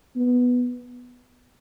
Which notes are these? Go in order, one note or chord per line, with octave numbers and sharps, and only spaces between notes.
B3